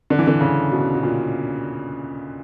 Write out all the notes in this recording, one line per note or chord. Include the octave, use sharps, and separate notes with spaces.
D3
E3
D3
C#3
B2
B2
A#2